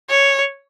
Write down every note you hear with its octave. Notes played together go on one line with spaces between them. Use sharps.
C#5